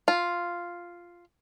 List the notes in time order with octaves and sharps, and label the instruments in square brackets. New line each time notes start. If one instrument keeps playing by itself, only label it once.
[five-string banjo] F4